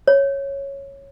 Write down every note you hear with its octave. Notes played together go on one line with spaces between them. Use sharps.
C#5